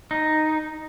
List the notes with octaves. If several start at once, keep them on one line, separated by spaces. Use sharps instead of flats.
D#4